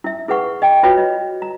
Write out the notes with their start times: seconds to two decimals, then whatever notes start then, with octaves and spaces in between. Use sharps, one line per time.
0.04 E4 E5
0.28 E4 G#4 B4 F#5 C#6
0.62 D#5 G5
0.83 F4 F#4 B4 C#5 G5
0.98 D#5
1.42 A#5